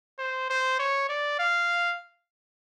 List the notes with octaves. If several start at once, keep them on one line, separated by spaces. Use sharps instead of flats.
C5
C5
C#5
D5
F5